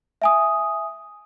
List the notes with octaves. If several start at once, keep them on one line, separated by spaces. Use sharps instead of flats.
E5 G#5 D#6